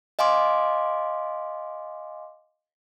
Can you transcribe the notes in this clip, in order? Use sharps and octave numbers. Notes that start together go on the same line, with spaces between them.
D#5 F5 G#5 C6 D6